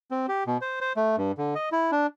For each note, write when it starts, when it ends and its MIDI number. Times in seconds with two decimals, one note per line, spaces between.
0.11 0.26 60
0.29 0.44 67
0.47 0.58 47
0.61 0.80 72
0.81 0.93 72
0.97 1.16 57
1.18 1.32 43
1.38 1.54 50
1.55 1.69 75
1.72 1.91 64
1.92 2.07 62